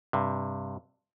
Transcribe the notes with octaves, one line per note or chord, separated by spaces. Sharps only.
G2 C3